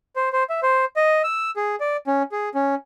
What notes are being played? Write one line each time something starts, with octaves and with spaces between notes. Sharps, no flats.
C5
C5
E5
C5
D#5
E6
G#4
D5
C#4
G#4
C#4